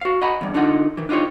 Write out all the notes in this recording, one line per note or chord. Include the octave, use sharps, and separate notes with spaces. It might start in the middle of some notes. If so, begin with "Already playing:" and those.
F#4 F5
D#5 F#5 G#5 A#5 B5
E2 G2
D3 D4 D#4 F4 F#5
D#3 E3
D4 D#4 F4 G4 C#5